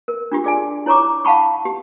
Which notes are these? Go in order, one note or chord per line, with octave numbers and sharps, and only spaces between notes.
A#4
D4 F4 G4
G#4 D5 G#5
E4 C#5 A#5 C#6 D6
F5 F#5 A5 B5 C#6
G4